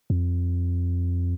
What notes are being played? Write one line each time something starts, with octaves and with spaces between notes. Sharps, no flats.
F2